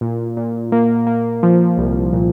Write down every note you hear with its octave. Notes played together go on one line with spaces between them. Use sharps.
A#2
A#2
A#3
A#3
F3
C2
A#2